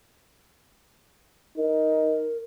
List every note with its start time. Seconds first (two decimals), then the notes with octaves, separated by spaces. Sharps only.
1.57 D#4 A#4